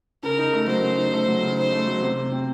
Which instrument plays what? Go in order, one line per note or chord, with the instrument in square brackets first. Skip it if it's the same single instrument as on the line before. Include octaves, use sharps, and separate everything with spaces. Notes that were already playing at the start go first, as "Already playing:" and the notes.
[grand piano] C#3 [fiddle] A#4
[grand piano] D#4
A3
[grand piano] F#3 [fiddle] C5
[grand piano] C#3
D#4
A3
F#3
C#3
[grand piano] D#4 [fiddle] C5
[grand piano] A3
F#3
C3
C3
C4